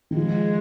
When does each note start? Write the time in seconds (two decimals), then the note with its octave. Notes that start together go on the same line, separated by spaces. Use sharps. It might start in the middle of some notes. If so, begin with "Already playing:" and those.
0.11 D#3
0.16 F3 G#3